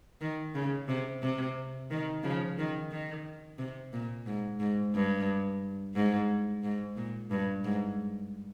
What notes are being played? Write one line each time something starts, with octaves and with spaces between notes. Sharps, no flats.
D#3
C#3
C3
C3
D#3
C#3 F3
D#3
D#3
C3
A#2
G#2
G#2
G2
G#2
G#2
A#2
G2
G#2